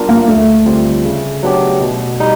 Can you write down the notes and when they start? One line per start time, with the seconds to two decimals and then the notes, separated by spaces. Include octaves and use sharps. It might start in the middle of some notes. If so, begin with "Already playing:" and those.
Already playing: G3 B3 D4 F4 A#4
0.09 A#3
0.28 D2 A3
0.66 D3 G3 C4 F4
1.05 C#3
1.43 F#3 B3 D4 G4
1.81 B2
2.20 G3 D#4